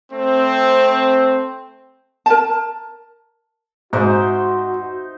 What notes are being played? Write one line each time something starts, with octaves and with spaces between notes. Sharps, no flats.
A3 C4
A#4 A5
G#2 D#4 F#4 C5 E5